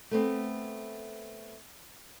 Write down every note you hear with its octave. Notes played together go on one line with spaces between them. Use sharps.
A3 B3 C4